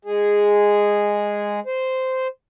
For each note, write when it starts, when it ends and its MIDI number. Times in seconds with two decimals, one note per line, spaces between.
0.05 1.60 56
0.05 1.60 68
1.66 2.28 72